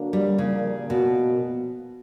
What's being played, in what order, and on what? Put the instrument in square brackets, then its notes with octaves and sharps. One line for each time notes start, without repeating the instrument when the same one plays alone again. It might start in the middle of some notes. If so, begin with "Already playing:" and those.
Already playing: [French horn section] D3 F#3 A#3 D4 F#4
[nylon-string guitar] G3
[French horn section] A#2 F3 A#3 [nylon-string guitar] C#3
[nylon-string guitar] B2